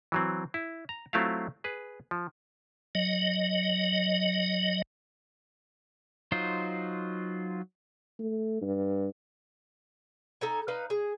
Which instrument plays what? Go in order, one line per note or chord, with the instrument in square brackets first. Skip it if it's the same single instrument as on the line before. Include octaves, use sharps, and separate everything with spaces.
[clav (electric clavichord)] E3 F#3 C4
E4
A#5
F#3 A3 C4 E4 F4 F5
G#4 B4
F3
[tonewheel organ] F#3 D#5
[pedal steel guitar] F#3 D#4 F4 C5
[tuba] A3
G2
[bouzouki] D#4 A4 G#5
D#4 B4 F5
G#4